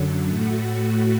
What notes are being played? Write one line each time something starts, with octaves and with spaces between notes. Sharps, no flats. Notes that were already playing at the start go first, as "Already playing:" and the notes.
Already playing: F#2 D3 F#3
A2 A3 F#4